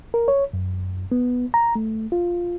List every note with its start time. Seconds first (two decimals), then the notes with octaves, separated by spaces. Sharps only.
0.14 A#4
0.28 C#5
0.53 F#2
1.12 B3
1.54 A#5
1.75 A3
2.12 F4